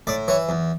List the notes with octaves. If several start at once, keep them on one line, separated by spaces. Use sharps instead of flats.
A2 D5
E3 C#5
E2